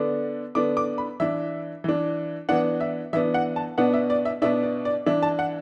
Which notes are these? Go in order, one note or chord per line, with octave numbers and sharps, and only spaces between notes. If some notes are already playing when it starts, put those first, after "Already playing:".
Already playing: D3 B3 D4
D3 B3 D4 D6
D6
B5
E3 D4 E5
E3 D4
E3 B3 D4 F#5
E5
E3 B3 D4 E5
F#5
A5
B2 B3 D4 F#5
E5
D5
E5
B2 B3 D4 E5
D5
D5
E3 D4 E5
A5
F#5